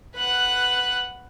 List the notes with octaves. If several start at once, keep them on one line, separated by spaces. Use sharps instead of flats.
B4 F#5